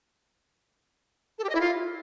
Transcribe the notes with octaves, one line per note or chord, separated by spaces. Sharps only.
A4
G4
D#5
E4
F4